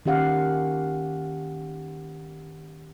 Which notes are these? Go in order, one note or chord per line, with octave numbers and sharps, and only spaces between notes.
D#3 C#4 G4 F5 F#5